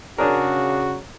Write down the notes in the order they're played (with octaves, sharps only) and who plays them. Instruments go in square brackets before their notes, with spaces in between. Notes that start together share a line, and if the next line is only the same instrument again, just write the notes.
[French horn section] C#3 [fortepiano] D4 G#4 A#4 [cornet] F#4 [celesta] C#5 D5 A#5